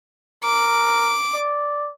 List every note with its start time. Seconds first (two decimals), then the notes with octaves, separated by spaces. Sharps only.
0.44 A#4 D6
1.34 D5